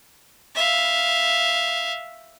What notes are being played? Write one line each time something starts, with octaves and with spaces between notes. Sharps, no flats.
E5 F5